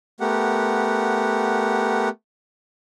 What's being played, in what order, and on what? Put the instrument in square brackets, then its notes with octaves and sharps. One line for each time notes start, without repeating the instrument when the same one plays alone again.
[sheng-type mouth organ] A3 B3 G4 A#4 F#5